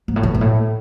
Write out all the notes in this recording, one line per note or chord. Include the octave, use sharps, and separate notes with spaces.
G#2
A2
B2
G#2
A2